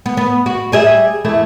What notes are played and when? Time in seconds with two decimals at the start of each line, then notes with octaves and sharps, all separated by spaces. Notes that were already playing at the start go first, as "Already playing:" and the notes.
0.06 B3
0.17 B3
0.46 F#4
0.72 G3 G#4 E5
1.25 E2 A3 E4